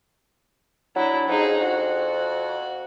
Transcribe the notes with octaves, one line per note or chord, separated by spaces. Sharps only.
F#3 D4 E4
F2 D#4 G#4
F#4